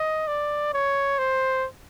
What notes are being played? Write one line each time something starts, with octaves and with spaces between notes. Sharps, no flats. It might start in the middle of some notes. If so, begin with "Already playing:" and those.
Already playing: D#5
D5
C#5
C5